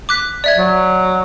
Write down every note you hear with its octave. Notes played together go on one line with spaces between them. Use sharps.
D6 F#6 B6
D5 E5 G#6
F#3